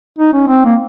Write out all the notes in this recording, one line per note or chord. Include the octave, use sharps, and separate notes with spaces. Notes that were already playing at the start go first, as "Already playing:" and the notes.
D#4
C#4
C4
A#3